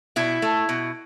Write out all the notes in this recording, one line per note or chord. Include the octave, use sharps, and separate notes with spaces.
B2 E4
A3
B2